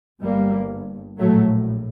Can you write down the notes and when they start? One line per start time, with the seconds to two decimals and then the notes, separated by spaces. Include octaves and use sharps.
0.21 G1 G2 G3 A#3
1.18 A#1 A2 F#3 A3